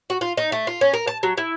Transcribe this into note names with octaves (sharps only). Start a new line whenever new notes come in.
F#4
F4
D#4
A3
F4
C#4
A#4
A5
F#3
E4